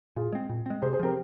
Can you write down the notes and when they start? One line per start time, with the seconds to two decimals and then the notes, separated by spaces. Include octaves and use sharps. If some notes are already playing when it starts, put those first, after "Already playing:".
0.16 A#2 F4 G#4
0.33 G#3 C4
0.49 A#2
0.66 G#3 C4
0.82 C3 G#4 C5
0.93 G#4 C5
0.99 F3 C4 G4 A#4